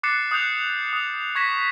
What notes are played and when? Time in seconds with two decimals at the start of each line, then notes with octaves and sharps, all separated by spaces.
0.03 D6 F#6 A6 C7 C#7 E7
0.31 D#6 F#6 G6 F7
0.93 D#6 F7
1.35 C#6 G#6 A#6 B6 E7